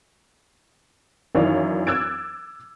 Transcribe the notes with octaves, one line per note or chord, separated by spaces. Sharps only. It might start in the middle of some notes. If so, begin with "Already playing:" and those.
F#2 D#3 E3 C#5 D5 F5
D6 E6 F#6 G#6 A6 D7